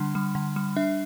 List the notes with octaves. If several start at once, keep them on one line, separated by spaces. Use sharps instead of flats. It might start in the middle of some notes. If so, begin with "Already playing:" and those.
Already playing: D3 G3 D4
G3
D3
G3
D4 E5